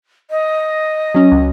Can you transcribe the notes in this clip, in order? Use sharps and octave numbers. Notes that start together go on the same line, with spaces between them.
D#5
F#3 C#4
C#2